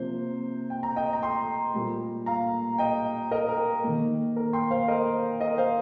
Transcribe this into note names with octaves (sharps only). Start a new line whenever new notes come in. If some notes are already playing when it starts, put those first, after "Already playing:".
Already playing: C3 F3 A#3 C5
G5
A#5
D#5 G5
A#5
G5 C6
A#2 G3 A#3
F5 A#5
D#5 G5
A#4 D#5
A#4
D#3 A#3
A#4
G5 C6
C5 F5
A#4 D#5
A#4 D#5
C5 F5